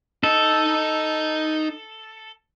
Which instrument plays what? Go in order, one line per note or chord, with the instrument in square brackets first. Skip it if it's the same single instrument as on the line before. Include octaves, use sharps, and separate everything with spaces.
[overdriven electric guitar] D#4 D#5 [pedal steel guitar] A4